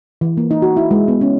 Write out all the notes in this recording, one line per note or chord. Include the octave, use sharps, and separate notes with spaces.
E3
A#3
D#4
F#4
E4
G#3
B3
C#4